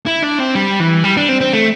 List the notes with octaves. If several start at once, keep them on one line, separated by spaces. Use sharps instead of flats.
E4
D4
C4
G3
E3
G3
D4
C4
C4
A3